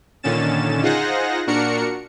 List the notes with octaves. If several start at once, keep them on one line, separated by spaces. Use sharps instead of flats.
A#2 D3 D#3 C#4 A6 E7
D#4 F4 G#4 C5 F#5 A#6
A#2 D4 F#4 A#4 C#7